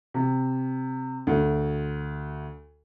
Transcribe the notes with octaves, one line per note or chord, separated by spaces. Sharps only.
C3
D2